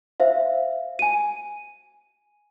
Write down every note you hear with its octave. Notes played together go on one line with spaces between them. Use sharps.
C5 E5 F5
G#5 D#7